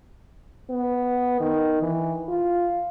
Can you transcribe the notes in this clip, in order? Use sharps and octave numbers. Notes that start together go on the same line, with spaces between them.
B3
D#3
E3
F4